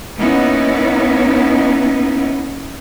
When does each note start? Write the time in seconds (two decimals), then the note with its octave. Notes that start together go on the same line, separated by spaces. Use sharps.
0.19 A#3 B3 C#4 D#4 E4